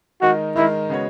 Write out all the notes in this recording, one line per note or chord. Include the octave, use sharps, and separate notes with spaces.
D#3 G#3 D#4 F#4 A#4
D#3 G#3 D#4 E4 A#4
C#3 G#3 B3 F#4 C#5